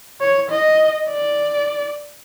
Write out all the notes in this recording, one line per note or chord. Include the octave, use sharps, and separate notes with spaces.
C#5
D#5
D5